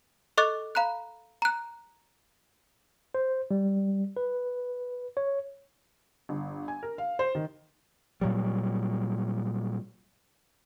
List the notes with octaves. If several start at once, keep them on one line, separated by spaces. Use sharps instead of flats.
A4 D#5 C#6 D6 F#6 A6
F5 A#5 B5 F#6
A#5 F#6
C5
G3
B4
C#5
G1
G#5
A#4
F5
C5
D#3
A#2 F#3 G3